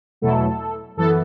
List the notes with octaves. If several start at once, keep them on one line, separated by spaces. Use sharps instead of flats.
E2 B2 F#3 A3 E4 A4
F#2 E3 B3 A4